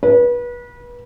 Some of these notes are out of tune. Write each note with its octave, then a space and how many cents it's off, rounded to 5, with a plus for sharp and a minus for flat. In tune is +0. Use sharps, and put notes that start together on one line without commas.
B4 -30